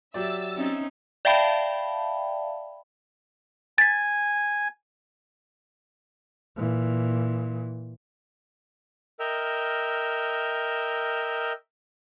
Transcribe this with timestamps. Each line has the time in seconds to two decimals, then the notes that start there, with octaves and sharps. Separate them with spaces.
0.14 F#3 G4 D5 E5 E6 A6
0.56 C4 C#4 D#4
1.25 D5 E5 F5 G5 A5 B5
3.78 G#5 A6 B6
6.56 A#2 E3
9.20 A#4 D#5 E5 G5 E6 F6